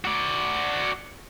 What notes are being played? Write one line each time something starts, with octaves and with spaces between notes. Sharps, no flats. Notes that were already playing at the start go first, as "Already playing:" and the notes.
F#4 D5